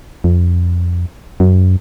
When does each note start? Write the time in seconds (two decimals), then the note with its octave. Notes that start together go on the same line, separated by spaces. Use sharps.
0.24 F2
1.40 F#2